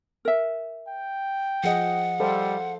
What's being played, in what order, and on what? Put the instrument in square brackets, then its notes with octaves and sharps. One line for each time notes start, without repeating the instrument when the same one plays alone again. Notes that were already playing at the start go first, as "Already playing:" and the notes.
[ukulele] A#4 E5
[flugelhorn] G5
[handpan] F3 G#4 D#5 [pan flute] F#5
[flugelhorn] G3 [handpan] A4 C5 F5